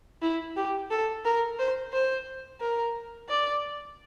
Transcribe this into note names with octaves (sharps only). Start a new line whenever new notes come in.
E4
G4
A4
A#4
C5
C5
A#4
D5